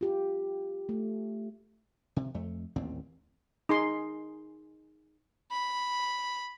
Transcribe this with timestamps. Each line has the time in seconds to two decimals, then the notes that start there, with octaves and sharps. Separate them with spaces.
0.01 F4 G4
0.89 A3
2.16 C3
2.34 F2 A3
2.76 A1 D#2 A#2 C4
3.69 D#4 G#4 C6
5.51 B5